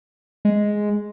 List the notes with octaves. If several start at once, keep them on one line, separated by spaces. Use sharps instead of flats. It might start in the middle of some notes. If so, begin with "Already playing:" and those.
G#3